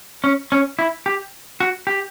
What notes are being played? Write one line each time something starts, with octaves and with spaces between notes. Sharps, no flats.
C#4
C#4
E4
G4
F#4
G4